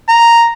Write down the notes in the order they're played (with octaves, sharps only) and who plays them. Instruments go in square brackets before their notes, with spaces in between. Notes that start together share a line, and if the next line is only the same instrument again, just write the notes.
[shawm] A#5